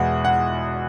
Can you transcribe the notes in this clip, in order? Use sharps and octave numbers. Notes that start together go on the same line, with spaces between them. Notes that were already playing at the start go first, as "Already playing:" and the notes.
Already playing: E2 B2 G#3 B3 F#5
F#5